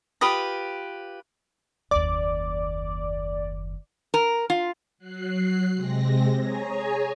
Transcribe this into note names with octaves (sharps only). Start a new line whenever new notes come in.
F4 G4 B4 D#6
F#1 D#2 D5
A#4
F4
F#3 F#6 C7
C3 G#3 C4 A#6
G#4 C#5 G#5 A#5